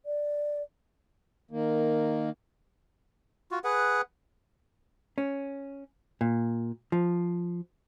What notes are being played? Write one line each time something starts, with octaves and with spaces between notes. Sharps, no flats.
D5
D#3 A#3
F4 F#4
G#4 B4 F#5
C#4
A#2
F3